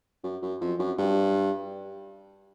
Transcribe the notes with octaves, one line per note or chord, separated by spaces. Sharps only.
F#2
F#2
F2
F#2
G2